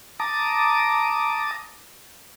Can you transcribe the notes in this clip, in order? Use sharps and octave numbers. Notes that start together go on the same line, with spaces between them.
A5 A#5 D6 D#6